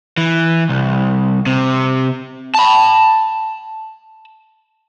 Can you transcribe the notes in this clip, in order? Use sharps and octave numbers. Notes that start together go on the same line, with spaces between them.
E3
C2
C3
A5 B5